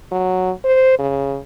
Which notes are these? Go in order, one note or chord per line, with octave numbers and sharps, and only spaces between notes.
F#3
C5
C#3